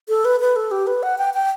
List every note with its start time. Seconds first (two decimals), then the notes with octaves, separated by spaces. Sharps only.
0.09 A4
0.25 B4
0.40 B4
0.56 A4
0.71 G4
0.87 B4
1.03 F#5
1.18 G5
1.34 G5